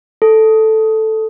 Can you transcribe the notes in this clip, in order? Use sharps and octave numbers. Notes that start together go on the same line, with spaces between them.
A4